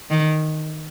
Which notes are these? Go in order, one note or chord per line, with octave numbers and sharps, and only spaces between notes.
D#3